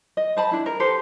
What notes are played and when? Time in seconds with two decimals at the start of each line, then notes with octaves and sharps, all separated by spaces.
0.17 D#5
0.37 C5 A5 B5
0.52 D4 E4
0.66 A#4
0.80 G4 A4 B4 C5